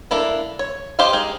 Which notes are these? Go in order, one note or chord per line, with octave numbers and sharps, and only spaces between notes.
A#3 D4 E4 A4
C#5
G4 C5 D#5 F5
G#3 D#4 G4 G#4